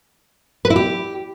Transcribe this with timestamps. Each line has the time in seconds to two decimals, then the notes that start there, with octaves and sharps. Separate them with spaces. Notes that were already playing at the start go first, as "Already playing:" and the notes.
0.65 B4
0.70 E4
0.76 G4